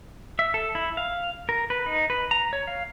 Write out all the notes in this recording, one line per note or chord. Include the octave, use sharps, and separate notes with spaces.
E5
A4
E4
F5
A#4
B4
D#4
B4
A#5
C#5
F5